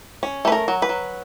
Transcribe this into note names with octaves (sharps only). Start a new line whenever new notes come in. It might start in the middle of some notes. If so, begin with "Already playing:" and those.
C#4
A3 B4
A#4
F#3
B4
F#3